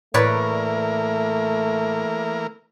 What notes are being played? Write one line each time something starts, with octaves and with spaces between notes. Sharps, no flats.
A2 E3 A3 A#3 A#4 B4 C#5 D5